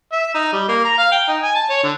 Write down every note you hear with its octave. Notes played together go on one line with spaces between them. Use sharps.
E5
D#4
G3
A#3
A#5
F5
G5
D#4
G#5
A5
C#5
D3